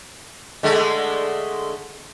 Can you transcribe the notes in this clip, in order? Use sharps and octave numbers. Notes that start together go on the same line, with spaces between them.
D3 G#3 A3